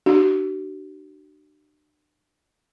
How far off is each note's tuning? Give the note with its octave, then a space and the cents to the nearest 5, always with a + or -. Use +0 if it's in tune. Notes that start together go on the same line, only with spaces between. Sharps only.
D4 +40 F#4 +40